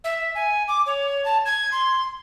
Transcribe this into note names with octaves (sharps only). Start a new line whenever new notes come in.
E5
G#5
D6
C#5
A5
G#6
C6